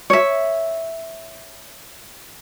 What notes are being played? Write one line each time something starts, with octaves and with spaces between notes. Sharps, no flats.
C#5 E5